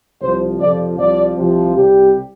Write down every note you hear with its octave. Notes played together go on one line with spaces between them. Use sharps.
C2 C3 F3 C5
F2 C3 F3 D5
C2 C3 F3 D5
C2 C3 F3
C2 C3 G3 G4